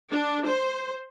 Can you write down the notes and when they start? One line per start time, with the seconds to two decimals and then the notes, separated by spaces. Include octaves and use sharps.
0.11 D4
0.47 C5